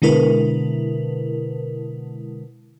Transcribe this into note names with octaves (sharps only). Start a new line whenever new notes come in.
B2 D3 G#3 E4 A#4 B4